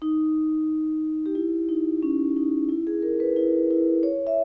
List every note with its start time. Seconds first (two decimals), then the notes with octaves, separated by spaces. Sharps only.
0.02 D#4
1.26 G4
1.35 E4
1.69 D#4
2.03 C#4
2.37 D#4
2.69 E4
2.87 G#4
3.02 A#4
3.20 B4
3.36 E4
3.70 E4
4.03 C#5
4.27 E5